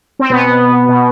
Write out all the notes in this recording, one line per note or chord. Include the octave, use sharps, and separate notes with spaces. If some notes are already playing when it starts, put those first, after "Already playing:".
C4
B2 B3
B2